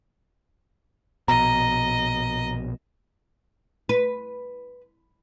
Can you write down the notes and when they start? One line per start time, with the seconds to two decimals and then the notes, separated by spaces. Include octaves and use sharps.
1.28 A#1 B2 D#5 A#5
3.89 B4